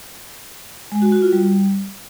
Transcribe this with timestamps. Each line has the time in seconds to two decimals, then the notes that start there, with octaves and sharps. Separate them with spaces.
0.92 G#3
1.02 F#4
1.12 F#4
1.22 F4
1.32 G3